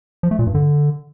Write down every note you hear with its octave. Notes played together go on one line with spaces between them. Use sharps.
F3
A3
A#2
G2
D3